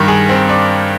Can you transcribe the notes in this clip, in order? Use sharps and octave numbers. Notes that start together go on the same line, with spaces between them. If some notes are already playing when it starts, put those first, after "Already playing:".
Already playing: G2 D#3 A#4
G#4
C4
D4